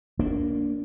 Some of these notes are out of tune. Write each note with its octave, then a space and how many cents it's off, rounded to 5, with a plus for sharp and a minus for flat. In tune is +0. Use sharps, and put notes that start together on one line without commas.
A#3 +0 D4 -20